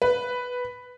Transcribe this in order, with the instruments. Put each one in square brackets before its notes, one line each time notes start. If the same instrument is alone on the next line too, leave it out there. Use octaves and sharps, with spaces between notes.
[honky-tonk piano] B4